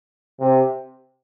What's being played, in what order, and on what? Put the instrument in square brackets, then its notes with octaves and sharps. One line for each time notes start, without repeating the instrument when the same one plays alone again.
[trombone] C3